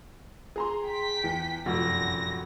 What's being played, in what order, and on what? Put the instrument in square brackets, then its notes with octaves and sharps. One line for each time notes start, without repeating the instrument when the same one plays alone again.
[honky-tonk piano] G#4 A#5 C6
[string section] G5 B6
[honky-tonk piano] E2
[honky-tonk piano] F1 A#2 F#4 [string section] F#2 A#6